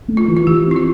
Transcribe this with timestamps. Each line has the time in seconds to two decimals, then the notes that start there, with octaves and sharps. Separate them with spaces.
0.08 A3
0.17 F4
0.28 E3
0.37 F4
0.47 E3 G4
0.67 C4 E4
0.76 F4